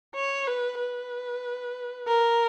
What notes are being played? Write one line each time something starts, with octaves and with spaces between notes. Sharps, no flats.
C#5
B4
B4
A#4